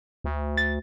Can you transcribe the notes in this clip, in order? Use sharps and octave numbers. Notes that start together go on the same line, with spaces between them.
D2
A6